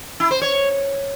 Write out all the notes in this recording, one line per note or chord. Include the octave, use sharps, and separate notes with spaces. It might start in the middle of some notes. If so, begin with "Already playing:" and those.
E4
C5
C#5